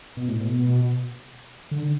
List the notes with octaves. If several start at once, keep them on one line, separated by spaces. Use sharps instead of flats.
B2
A2
B2
D3